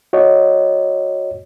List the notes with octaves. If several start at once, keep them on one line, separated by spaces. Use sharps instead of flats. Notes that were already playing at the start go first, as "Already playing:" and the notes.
F#4 C#5 D#5